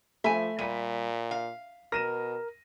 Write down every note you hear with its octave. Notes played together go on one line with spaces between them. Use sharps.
F3 A3 E5 G#5 B5
A#2 G3 B6 D#7
F5
B2 A#4 A#6 D#7 E7